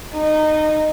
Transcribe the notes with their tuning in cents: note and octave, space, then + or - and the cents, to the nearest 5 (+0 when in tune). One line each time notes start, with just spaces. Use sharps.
D#4 -15